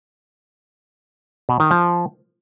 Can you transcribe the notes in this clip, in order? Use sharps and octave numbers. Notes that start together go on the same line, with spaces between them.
B2
D#3
F3